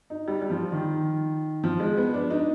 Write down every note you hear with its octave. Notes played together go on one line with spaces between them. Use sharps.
D#4
G3
G3
F3
D#3
F3
G#3
B3
D4
D#4